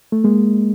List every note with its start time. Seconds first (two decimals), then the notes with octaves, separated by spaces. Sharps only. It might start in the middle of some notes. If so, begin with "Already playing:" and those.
0.12 A3
0.24 G#3 A#3